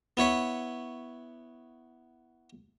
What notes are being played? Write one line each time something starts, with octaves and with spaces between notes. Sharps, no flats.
B3 E4 C#5 B5